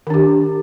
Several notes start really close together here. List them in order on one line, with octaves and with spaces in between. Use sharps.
D#3 D4 G4